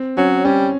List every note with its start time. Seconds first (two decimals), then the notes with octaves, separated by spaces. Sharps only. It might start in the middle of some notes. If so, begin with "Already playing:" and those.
Already playing: C4
0.17 F#3 C#4
0.45 G3 C#4